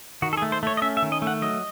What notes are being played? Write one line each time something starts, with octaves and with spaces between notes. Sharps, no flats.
D#3 F#4
A4
G#4
A3
C5
A3 C#5
D#5
C#4 E5
E5
D#3
D#5
A3
F#5
F#3 D#5